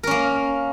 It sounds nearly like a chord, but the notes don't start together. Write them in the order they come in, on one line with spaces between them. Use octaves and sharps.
A#4 C#4 A#3